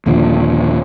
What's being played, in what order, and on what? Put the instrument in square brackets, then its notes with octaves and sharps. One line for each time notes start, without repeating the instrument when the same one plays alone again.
[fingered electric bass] D#2 A#2 D3 F3